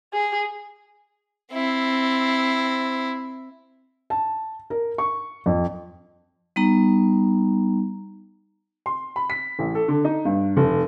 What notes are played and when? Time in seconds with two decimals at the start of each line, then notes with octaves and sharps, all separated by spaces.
0.13 G#4
1.52 C4 E4
4.10 A5
4.70 A#4
4.98 C#6
5.46 F2
6.56 G3 B3 D#4 A#5
8.86 C6
9.16 B5
9.30 B6
9.59 A1
9.75 A4
9.88 D3
10.05 D#4
10.25 G2
10.57 F1